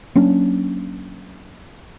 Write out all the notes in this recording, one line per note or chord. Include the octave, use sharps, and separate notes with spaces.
F#3 A#3 C#4 D4